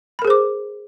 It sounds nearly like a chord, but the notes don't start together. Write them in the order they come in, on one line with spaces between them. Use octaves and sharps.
B5 A#4 G#4 C5 D6